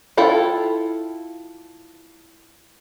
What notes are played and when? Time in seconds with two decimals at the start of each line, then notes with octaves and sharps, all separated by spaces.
0.17 E4 F4 A4 G5